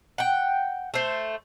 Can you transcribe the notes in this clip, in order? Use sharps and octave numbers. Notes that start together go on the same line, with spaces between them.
F#5 G5
A3 C5